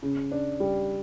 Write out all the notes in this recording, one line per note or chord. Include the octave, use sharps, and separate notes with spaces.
C#3
D4
G3